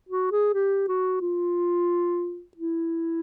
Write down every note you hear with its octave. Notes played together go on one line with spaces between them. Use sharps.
F#4
G#4
G4
F#4
F4
E4